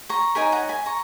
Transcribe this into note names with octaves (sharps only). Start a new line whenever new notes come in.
A#5 C#6
D#4 A#4 C#5 G#5 B5
F#5 A#5
G#5 B5
A#5 C#6